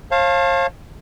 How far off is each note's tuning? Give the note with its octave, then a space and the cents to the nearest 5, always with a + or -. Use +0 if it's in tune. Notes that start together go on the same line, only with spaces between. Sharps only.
C#5 -45 F5 +0 A5 +0